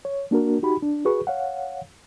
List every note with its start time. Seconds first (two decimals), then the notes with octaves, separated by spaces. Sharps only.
0.05 C#5
0.31 A#3 D4 F#4 A#4
0.63 D#4 F#4 G4 B5
0.83 D4
1.05 F#4 G#4 B4 C#6
1.27 C#5 F5 F#5